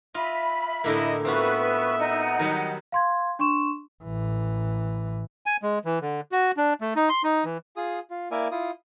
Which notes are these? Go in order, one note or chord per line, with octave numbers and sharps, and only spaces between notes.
F4 D#5 E5 B5
A2 D3 A#3 E4 D#5
B3 C4 F4 F#4 B4 E5 C#6
D#4 F#5
D#3 F#3 G3
F5 C6 G#6
D4 C6 C#6 E7
A1 E3
G#5
G#3
E3
D3
F#4
D4
A3
D#4
C6
D#4
E3
F4 G#4 D#6
F4
A#3 E4 A#4 D5 E5 G#5
E4 F4 D#6